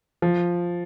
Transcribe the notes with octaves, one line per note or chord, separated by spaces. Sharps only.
F3